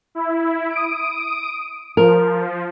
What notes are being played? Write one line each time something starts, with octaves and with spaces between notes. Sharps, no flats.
E4
D#6 D7
F3 A#4